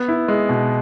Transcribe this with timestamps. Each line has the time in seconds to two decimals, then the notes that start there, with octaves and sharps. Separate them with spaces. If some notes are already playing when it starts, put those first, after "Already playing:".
Already playing: B3
0.08 E4
0.28 G#3
0.49 B2